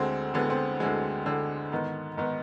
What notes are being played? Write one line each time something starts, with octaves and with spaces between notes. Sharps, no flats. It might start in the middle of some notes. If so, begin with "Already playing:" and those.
Already playing: D2 D3 G#3 C4
D2 D3 G#3 B3
C4
D2 D3 G#3
D2 D3 G#3
G#2 D#3 B3
G#2 D#3 B3